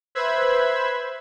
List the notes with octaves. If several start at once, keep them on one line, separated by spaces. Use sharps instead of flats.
B4 C5 E5 B5 E6 G#6